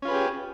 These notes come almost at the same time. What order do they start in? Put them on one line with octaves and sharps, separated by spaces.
C#4 F4 B4 G#4 G4